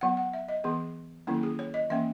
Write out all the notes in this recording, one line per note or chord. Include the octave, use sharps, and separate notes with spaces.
F#3 B3 F#5
F#5
E5
D#5
E3 B3 G#4
D#3 F#3 A#3 C#4 E4
G#4
C#5
D#5
E3 A#3 C#4 E5